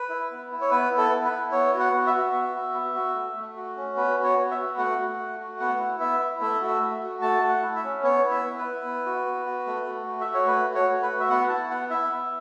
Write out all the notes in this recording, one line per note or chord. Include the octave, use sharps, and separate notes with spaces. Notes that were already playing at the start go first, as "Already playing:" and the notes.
Already playing: B4
E4
B3
E4
C#5
B3 B4
E4
A4
B3
B4
E4
B3 C#5
F#4
F#5
B3
E5
F#4
B3
F#4
B3
F#4
A3
A3
F#4
C#4
B3 B4
F#4
C#5
B3
E5
F#4
A3 F#5
F#4
A3
F#4
B3 F#5
E4
B3 E5
E4
A3 E5
F#4
E5
A3
F#4
A3 A5
A3
F#5
E4
E5
C#4
B3 C#5
E4
E5
B3
B4
E4
B3
F#4
B3
F#4
A3
F#4
A3
E5
F#4
C#5
A3 B4
F#4
C#5
A3
B4
F#4
E5
B3 F#5
E4 A5
B3 F#5
E4 E5
B3